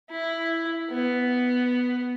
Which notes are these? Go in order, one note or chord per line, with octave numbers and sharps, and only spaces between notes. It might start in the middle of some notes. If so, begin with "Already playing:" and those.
E4
B3